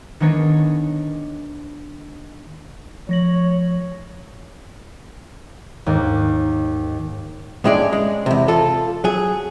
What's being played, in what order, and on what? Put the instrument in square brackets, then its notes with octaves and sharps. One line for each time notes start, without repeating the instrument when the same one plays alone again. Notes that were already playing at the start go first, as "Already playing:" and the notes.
[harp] D#3 G#3 B3 D4 D#4 C#5
[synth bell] F3 A#6 F#7 [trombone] C#5
[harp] D#2 G#2
[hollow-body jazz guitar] A2 D3 G#3 C#4 G#4 D5
G#3
E2 C3
F4 A4
F#3 G#4